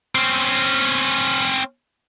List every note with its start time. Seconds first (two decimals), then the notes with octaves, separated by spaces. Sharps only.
0.15 C4 C#4